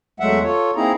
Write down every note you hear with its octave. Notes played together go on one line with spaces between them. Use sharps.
E2 F#3 G#3 A3 E5 F#5
F4 A4 C#5
A#3 C4 D#4 E4 G#4 A#5